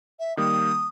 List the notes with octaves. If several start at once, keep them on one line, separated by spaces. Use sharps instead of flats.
E5
D#3 G3 A#3 D#6